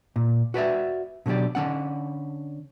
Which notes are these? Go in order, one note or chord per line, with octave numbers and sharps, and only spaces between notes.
A#2
F#4 B4 D5 E5
B2 D3 F#3 G4 D5
D3 C#4 F#5